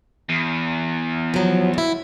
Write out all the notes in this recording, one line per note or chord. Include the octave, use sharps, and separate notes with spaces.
E2
F3 F#3
D2 E4